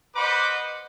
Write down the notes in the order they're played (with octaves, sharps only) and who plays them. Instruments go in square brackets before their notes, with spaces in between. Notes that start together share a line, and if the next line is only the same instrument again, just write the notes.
[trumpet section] B4 C5 D#5 F#5 B5 D6